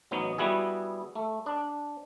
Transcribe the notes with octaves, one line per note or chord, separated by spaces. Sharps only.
A1 F#3 B3 D#4
G3 B3 E4 F#4 G#4
A3
D4